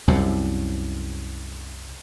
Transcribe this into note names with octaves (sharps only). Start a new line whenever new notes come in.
C2 F#2 C3